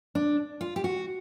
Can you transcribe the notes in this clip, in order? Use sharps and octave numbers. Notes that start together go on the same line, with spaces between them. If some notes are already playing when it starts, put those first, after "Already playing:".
D4
F4
G4
F#4